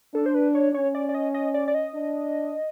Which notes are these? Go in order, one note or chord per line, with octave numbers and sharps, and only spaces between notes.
D4 A4
C5
B4
C#5
C#4 C#5
D5
D5
D#5
D#5
D5
D5
D#5
D4